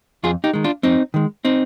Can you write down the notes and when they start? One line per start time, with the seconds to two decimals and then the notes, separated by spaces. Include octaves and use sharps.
0.24 F2 F4 G#4
0.44 D#4 G4
0.53 D#3 G#3
0.64 D4 F4
0.83 F2 C4 D#4
1.14 D#3 G#3
1.45 C4 D#4